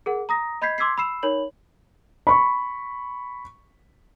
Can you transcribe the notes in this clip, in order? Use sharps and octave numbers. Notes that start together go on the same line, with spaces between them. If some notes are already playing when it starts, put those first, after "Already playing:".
G#4 A#4 F#5
A#5 D#6 A#6
D#5 B5 G6 G#6 B6 C7
C6 D6 E6 G#6 B6 C7
B5 E6 C7 E7
D#4 A#4 C#5 B5 F#7
B5 C#6